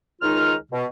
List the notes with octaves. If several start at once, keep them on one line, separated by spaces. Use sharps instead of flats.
C#2 D#3 G#3 D#4 F4 F6
B2